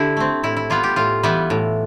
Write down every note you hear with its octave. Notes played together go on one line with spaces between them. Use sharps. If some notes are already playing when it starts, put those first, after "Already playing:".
Already playing: D3 E4 G4
A3 C4
A2 E4
E4
G3 B3 F4
G4
A2 F4
E3 G3 B3
A2